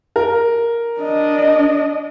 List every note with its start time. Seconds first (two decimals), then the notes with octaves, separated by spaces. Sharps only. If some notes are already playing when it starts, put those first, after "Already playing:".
0.16 A#4
1.00 D4 D#5